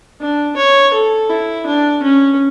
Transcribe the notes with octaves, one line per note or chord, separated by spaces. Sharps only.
D4
C#5
A4
E4
D4
C#4